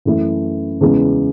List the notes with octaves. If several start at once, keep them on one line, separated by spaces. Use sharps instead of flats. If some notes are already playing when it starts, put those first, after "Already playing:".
F#2 E3 A3 E4 A4
E2 C#3 G#3 B3